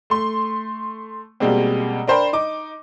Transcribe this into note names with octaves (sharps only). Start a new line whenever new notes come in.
A3 C6
B2 G3 G#3 A#3 C4
D4 A#4 C5 G5 B5
D#4 D6